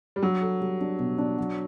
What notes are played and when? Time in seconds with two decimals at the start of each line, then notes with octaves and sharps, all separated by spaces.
0.16 G3
0.22 F#3 D4
0.41 A4
0.61 G3
0.81 D4
0.99 B2
1.18 D4
1.38 F#3